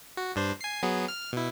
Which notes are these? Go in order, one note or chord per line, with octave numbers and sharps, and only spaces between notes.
F#4
G2 D4 C5
G#5 C7
F#3 B3 G#4
F6
B2 E4